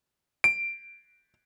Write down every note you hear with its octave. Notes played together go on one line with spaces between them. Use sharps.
D7